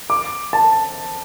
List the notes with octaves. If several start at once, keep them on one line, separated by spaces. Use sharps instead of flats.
D6
A5